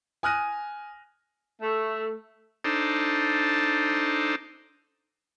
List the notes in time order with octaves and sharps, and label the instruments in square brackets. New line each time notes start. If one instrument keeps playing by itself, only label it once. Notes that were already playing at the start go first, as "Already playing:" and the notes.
[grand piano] G#5 D#6 F6 F#6 A#6 D#7
[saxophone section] A3
[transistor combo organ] D4 D#4 A4 C5